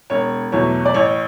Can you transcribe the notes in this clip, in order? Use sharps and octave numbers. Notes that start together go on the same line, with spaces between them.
E1 C#5
E2 B2 F#3 A3 C#5
D5
A1 C#5